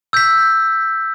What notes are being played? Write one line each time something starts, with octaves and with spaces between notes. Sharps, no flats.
E6 G6 B6